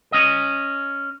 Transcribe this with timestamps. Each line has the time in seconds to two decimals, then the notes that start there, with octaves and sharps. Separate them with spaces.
0.12 C#4 D#5